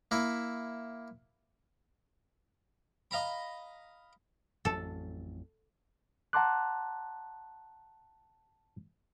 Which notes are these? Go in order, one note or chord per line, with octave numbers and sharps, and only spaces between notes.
A#3 E4 E5
D#5 F5 A#5 B5
A1 F2 F#3 A4
F#5 A5 A#5 C6 D6 F#6